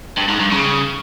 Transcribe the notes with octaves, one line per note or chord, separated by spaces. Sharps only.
G2
G#2
G2
C#3